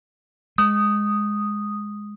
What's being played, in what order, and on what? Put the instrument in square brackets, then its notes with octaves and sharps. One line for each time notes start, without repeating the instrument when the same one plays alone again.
[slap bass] G#3 [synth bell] D#6